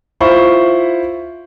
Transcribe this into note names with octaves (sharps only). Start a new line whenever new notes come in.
E4 F4 C5 B5 C#6